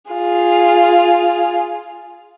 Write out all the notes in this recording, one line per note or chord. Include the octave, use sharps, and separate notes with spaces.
F4 G#4